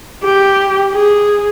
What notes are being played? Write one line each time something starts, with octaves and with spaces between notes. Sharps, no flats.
G4
G#4